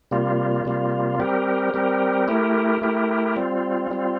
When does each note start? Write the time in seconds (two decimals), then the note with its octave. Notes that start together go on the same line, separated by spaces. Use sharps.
0.11 C3 G3 A#3 F4
0.65 C3 G3 A#3 F4
1.20 G3 C4 G4 A#4
1.74 G3 C4 G4 A#4
2.28 A3 E4 G4 A#4
2.82 A3 E4 G4 A#4
3.36 G3 C4 F4
3.91 G3 C4 F4